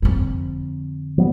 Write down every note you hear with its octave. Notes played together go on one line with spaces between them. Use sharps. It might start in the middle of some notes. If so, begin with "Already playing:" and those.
F2 D3
F3 G3 B3